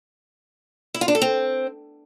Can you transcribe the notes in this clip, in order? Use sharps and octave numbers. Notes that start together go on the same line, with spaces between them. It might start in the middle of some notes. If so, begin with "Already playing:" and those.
E4
F4
D4
A4
C4